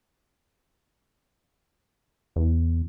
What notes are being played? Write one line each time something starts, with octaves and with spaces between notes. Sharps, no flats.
E2